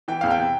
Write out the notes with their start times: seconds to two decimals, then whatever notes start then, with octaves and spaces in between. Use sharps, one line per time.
0.08 E3 G5
0.21 E2 F5
0.31 G5
0.38 C3